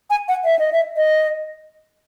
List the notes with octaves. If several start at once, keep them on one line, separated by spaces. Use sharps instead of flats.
G#5
F#5
E5
D#5
E5
D#5